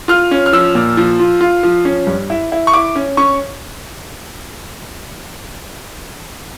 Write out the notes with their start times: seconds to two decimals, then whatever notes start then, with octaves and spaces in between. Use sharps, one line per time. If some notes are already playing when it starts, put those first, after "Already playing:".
0.08 F4 F6
0.31 C#4
0.46 F6
0.53 F3 E6
0.75 A#2
0.97 F3
1.19 F4
1.41 F4
1.63 F3
1.85 C#4
2.07 G2
2.30 E4
2.52 E4
2.67 C#6
2.74 E4 D6
2.96 C#4
3.17 C#4 C#6